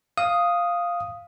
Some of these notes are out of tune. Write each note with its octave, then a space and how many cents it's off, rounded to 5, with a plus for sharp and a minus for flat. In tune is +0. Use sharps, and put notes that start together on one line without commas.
F5 +0 D#6 +0